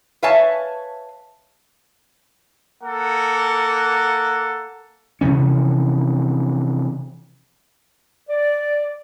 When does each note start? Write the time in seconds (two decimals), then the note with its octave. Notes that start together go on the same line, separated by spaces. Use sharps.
0.23 B4 C#5 E5 F5 G#5 A5
2.83 A#3 A4 F#5
5.21 C3 E3 F3 C#4
8.29 D5